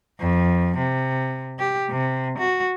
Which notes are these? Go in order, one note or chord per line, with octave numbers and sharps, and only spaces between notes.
F2
C3
G4
C3
F#4